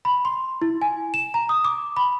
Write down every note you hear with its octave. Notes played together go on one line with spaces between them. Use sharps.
B5
C6
E4
G#5
E7
A#5
D#6
D6
B5